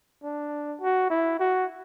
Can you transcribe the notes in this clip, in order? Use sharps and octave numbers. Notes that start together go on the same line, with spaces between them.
D4
F#4
E4
F#4